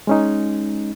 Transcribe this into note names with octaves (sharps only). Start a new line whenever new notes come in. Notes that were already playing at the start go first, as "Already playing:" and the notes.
G#3 C#4 D#4